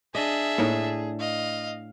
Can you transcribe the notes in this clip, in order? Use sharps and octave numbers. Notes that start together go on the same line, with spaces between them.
D4 G#4 D#5 E5
A2 A#3 D#4
D#5 F5